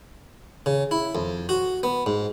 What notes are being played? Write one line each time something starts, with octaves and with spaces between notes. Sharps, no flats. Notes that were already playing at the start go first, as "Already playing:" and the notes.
C#3
E4
F2
F#4
B3
G#2